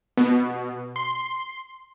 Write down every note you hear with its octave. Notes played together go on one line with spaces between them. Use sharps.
B2
C6